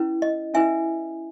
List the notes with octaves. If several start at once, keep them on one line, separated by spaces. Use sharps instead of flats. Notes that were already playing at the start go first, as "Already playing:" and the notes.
Already playing: C#4 E4 B4
D#5
C#4 E4 B4 E5 G#5